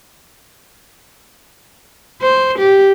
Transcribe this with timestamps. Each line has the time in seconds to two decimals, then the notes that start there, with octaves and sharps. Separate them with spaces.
2.21 C5
2.58 G4